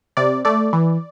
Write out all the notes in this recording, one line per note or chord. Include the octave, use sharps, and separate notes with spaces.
C3 D5
A3 D5
E3